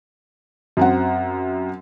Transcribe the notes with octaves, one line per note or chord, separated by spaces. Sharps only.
F#2 C4 F#5